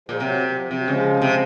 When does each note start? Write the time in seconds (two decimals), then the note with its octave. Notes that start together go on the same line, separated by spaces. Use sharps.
0.09 A#2 F3 G#3
0.20 C3 F#3
0.54 F3
0.65 F3
0.71 C3
0.76 F#3
0.88 C#3 F3 G#3
1.22 C3